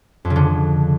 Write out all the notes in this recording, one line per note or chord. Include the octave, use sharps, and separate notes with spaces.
F2
C#3
D3